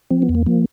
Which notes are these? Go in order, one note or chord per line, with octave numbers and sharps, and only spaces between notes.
F3 C4
B3
E2
A#3
F3 A#3